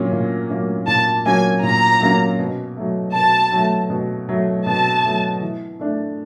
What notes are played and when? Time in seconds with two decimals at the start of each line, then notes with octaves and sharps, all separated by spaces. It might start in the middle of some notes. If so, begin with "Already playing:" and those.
Already playing: A#2 F#3 A#3 C#4
0.12 A#2
0.50 F#3 A#3 C#4
0.88 A#2 A5
1.26 F#3 A#3 C#4 G#5
1.63 A#2 A#5
2.01 F#3 A#3 C#4
2.39 B2
2.77 F#3 A3
3.14 B2 A5
3.52 F#3 A3
3.90 B2
4.29 F#3 A3
4.66 B2 A5
5.04 F#3 A3
5.41 E3
5.79 A3 D4